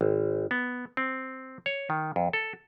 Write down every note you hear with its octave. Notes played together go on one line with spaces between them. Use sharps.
G#1
B3
C4
C#5
D#3
F2
A4